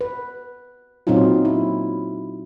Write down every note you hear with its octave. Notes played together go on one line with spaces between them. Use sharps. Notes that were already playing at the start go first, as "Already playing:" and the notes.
B4
A#2 F#3 C4 C#4 D#4 F4
E4